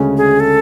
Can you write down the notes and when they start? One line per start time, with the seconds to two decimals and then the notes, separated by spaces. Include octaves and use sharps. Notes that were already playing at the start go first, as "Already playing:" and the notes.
Already playing: D2 C#3 G#3 C#4
0.17 G#4
0.40 A4